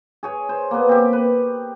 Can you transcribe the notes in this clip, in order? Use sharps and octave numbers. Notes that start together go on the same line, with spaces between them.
G#4 C#5 G#5
C5
A#3 B3
C4 G4
B4